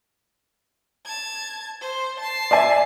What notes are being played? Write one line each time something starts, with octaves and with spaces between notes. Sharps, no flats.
A5 G#6
C5
A5 C7
D5 E5 G#5